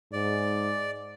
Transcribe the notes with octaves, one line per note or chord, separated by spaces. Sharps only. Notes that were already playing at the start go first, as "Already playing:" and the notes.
G#2 D5